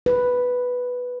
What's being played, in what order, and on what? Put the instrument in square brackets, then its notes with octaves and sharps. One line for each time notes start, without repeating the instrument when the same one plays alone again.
[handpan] B4